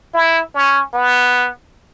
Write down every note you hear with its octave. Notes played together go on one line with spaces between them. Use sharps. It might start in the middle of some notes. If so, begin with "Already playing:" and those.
E4
C#4
B3